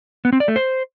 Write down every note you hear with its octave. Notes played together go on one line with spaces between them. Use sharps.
B3
C4
D5
A3
C5